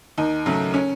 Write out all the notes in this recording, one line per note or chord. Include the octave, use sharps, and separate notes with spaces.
D#2 D#4
C#3 F#3 A3
C#4